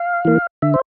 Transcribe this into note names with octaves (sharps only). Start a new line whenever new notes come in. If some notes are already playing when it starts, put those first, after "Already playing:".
Already playing: F5
E3 A#3
D3 E5
C5